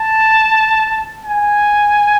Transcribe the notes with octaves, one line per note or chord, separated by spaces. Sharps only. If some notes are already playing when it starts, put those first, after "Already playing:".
Already playing: A5
G#5